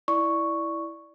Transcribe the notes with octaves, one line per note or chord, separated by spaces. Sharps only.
E4 D5 C#6